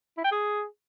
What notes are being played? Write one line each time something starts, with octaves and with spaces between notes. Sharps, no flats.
E4
G5
G#4